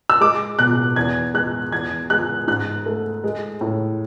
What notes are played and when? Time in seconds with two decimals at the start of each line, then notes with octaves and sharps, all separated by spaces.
0.10 E6
0.21 G#3 D6
0.59 B2 F#6
0.96 E2 G#6
1.34 G#3 F#6
1.72 E2 G#6
2.10 G#3 F#6
2.47 G#2 F#6
2.86 A3
3.24 G#3
3.61 A2